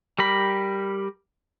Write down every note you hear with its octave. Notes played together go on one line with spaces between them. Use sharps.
G3 G4 A#4 B5